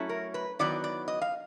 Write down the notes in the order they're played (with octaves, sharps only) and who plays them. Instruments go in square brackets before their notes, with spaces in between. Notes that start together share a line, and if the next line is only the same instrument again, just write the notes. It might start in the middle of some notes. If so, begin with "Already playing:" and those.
Already playing: [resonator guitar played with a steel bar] F#3 A3 C#4 E4
A#4
B4
D#3 F#3 B3 E4 D5
D5
D#5
F5